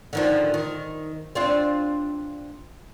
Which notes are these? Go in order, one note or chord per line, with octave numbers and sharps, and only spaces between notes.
D3 D#3 F3
D#3
C4 D4 F4